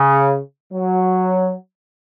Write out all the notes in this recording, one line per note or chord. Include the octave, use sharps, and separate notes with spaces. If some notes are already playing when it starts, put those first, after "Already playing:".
Already playing: C#3
F#3